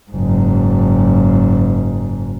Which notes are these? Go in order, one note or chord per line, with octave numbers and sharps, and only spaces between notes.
F#1 G#2